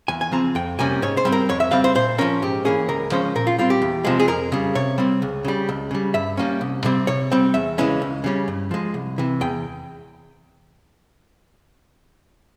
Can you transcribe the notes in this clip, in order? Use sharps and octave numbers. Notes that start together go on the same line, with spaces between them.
E2 G#5
G#5
C#3 F3 C4 A#5
F2 G5
C3 G3 A#3 C#4 G#5
G#2 C#5
C5
G3 C4
A#4
F2 C#5
E5
C#3 G3 C4 F5
C5
A#2 C5
F3 G#3 C#4 A#4
G#2 G4
E3 A#3 C#4 G#4
C#2 A#4
C#3 F3 G#3 C#4 C5
A#2 A#4
F4
G3 C4 F4
G4
E2
C3 F3 G#3
G#4
F2 A#4
C#3 G3
C3 C#5
G3 C4
C#2
C#3 G3
C#2
C#3 G3
G2 E5
G3 A#3 C#4
C2
C3 G3 C4
C3 C#5
G3 C4
E2 E5
C#3 E3 G#3 C#4
C#2
C#3 G3 C#4
G2
F3 G#3
C2
C3 E3
E2 G5